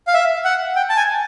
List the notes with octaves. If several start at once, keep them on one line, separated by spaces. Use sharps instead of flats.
F5
E5
F#5
G5
A5
G#5